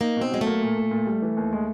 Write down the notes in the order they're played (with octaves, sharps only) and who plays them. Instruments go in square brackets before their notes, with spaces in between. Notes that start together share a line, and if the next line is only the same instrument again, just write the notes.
[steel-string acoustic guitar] A#3 [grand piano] D#4
[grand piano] B2 [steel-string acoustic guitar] C4
[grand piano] F#3 [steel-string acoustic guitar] G#3
[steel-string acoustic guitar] A3
[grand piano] A#3
A#2
A#2
A#2
G3
E3
D#2
G#3